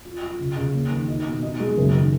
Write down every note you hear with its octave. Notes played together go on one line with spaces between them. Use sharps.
F4
F4
C#3
C#3
A#3
D#3
D#4
B2
D#4
G#3
F#1
D#3